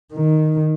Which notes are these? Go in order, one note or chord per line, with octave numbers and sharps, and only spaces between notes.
D#3